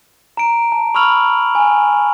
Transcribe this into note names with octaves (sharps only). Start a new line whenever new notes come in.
A#5 D7
A5
B5 C#6 E6 F6 F7 F#7
G#5